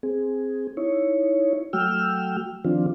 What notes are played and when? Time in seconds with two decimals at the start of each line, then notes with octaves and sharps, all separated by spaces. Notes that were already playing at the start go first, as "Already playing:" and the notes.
0.03 C4 G#4
0.77 D#4 E4 C#5
1.73 F#3 A3 F#4 G5 E6 F6
2.65 D#3 F3 C4 D4 F4